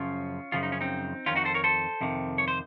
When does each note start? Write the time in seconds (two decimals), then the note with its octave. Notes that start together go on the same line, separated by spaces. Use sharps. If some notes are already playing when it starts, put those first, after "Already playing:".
Already playing: F#2 C#3 F3 C#4 F4
0.52 F#2 C#3 F3 F4
0.63 D#4
0.72 C#4
0.81 C4 D#4
1.26 D#3 C#4 F4
1.30 F2
1.35 D#4 F#4
1.45 A4 C5
1.54 A#4 C#5
1.64 A4 C5
2.01 F2 C3 D#3
2.38 C#5
2.48 C5